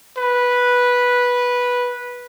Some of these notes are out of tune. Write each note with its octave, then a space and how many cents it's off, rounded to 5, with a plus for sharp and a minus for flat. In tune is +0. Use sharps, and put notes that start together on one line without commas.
B4 -10